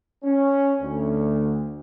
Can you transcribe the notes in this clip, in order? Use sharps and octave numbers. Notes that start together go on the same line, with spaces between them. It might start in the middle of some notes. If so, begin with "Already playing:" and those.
C#4
D2